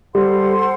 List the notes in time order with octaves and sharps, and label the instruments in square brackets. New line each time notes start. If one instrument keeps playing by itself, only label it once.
[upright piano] G3 [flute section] A4 C5 F#5 C6